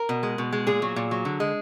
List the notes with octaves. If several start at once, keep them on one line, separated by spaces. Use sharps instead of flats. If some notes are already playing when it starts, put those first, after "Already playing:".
Already playing: A#4
B2
G#3
B2
G#3
A#2 G#4
F#3
A#2
F#3
D3
G#3